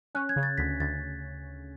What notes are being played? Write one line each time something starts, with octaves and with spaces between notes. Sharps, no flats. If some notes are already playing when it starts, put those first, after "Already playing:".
C#4 F#6
G#6
C#3
A6
D2 B6
D2 A6